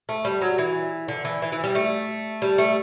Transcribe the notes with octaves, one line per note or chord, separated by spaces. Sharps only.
A3
G3
F#3
E3
D3
E3
E3
E3
G3
A3
G3
A3